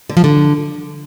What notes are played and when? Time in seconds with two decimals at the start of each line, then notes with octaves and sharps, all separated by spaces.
0.10 D3
0.17 F3
0.24 D3